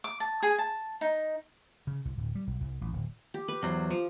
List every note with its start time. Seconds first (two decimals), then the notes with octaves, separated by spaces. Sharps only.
0.04 D6
0.20 A5
0.43 G#4
0.58 A5
1.01 D#4
1.87 C#3
2.05 C2
2.18 D1
2.35 G3
2.47 B1
2.61 C2
2.81 A1
2.93 D1
3.34 G4
3.48 B4
3.63 E2 F#3 C5
3.91 F3